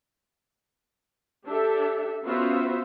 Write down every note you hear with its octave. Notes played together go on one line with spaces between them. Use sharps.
D4 G4 A4 E5
B3 C#4 F4 F#4 C5 E5